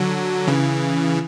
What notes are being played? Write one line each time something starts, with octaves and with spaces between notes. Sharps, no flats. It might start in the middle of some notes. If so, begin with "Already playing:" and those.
Already playing: D3 F#3
C#3 E3